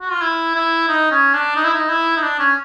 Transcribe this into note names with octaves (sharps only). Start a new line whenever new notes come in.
F#4
F4
E4
E4
D#4
C#4
D4
D#4
E4
D#4
E4
D#4
D4
C#4